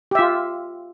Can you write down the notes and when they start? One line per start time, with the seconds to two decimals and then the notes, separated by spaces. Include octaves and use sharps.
0.11 G4
0.15 E5
0.19 F4